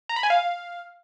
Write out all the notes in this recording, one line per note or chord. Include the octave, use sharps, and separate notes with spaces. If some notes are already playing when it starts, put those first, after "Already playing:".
A#5
B5
G#5
F5